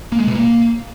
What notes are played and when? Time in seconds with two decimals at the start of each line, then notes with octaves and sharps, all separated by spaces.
0.12 A#3
0.20 G#3
0.27 B2
0.35 A#3